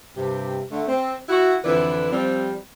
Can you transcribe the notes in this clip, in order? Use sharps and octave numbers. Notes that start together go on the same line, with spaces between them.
G2 C3 G4
D3 A3
C4
E4 F#4
F2 D3 E3 E4 B4 D5
F3 G3 C4